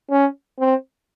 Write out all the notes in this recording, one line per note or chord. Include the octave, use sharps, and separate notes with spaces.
C#4
C4